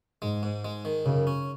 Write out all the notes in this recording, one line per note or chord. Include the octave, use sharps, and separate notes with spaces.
G#2 G#3
G#2
G#3
D#3
F#2 C#3
C#4